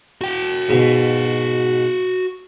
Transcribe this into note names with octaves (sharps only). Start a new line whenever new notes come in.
F#4 G5
G#2 B2